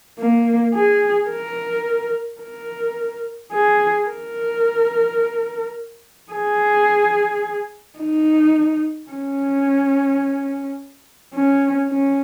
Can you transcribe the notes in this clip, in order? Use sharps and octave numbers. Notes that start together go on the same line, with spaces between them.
A#3
G#4
A#4
A#4
G#4
A#4
G#4
D#4
C#4
C#4
C#4